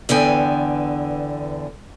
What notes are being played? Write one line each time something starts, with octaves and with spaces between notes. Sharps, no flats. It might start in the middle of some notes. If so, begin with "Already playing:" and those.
E2 D3 B3 G5 G#5